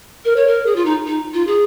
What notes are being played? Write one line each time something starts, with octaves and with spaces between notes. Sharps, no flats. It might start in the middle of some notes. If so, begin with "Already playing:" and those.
A#4
C#5
A#4
G#4
F4
D#4
D#4
F4
G#4